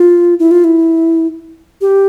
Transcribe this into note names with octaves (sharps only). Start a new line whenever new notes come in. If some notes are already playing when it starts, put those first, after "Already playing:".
Already playing: F4
E4
F4
E4
G4